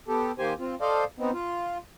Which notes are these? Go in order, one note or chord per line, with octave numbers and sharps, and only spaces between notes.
B3 G4 A4
D#3 A#3 G4 C5 G#5
C4 F4
A4 C5 D5 D#5 F5
B3 C4 D#4
F4